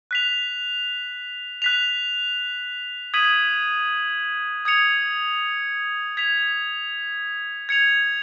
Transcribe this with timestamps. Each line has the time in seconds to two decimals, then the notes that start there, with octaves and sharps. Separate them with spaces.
0.11 F#6 B6 F7
1.62 F#6 B6 F7
3.14 D#6 G#6 B6 D#7 F#7
4.65 D#6 G#6 C#7 F7
6.17 G#6 B6 F7
7.69 G#6 C#7 F7